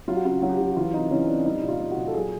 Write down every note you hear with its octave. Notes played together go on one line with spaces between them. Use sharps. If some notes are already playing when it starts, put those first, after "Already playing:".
F#3 F4
F#4
C#3 F4
F#3 F#4
G4
F#3 F#4
F#4
E3 F4
C3 D#4
E3 C#4
C3 D4
G3 D#4
A#2
F4
G3
F#4
A#2
A4
F#3 G#4